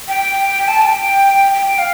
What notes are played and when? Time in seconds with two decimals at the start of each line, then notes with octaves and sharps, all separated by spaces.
0.08 G5
0.68 A5
0.82 G5
1.54 G5
1.79 F5